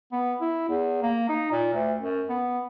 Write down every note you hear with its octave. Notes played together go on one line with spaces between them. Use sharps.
B3
E4
E2
A#3
D#4
A#2
D2
F#2
B3